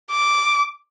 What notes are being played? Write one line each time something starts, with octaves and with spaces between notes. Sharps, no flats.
D6